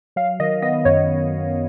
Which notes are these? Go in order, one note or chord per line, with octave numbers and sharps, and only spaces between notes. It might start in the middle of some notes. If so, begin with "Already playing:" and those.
F#3 F5
D#3 D#5
B3 D#5
F#2 C#5